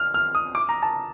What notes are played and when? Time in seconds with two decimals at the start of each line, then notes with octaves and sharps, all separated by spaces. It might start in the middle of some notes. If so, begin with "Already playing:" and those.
Already playing: F6
0.14 F6
0.35 D#6
0.55 D6
0.69 A#5
0.82 A5